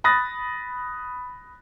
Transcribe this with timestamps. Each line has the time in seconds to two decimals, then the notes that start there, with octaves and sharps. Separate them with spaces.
0.04 B5 D#6 F#6 A6 A#6